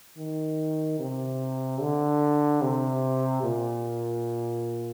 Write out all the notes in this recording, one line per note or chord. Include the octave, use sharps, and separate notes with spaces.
D#3
C3
D3
C3
A#2